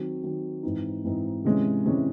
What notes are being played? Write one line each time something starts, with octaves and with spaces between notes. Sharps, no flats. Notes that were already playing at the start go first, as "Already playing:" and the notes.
Already playing: D#3 F#3 C4
D#3 F#3 C4
G#2 E3 C4 D#4
G#2 E3 C4 D#4
C3 E3 G#3 C#4
C3 E3 G#3 C#4